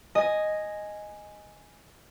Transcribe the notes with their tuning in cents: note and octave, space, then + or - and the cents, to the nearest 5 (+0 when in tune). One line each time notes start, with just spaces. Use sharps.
D#5 +0 G#5 +0